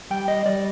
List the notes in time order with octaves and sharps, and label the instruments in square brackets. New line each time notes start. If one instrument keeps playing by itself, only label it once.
[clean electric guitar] G3 G5
D#5
G3 D5